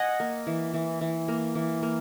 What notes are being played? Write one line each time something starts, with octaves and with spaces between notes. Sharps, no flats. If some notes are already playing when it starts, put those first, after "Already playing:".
Already playing: D#5 F#5 G#5
A#3
E3
E3
E3
A#3
E3
A#3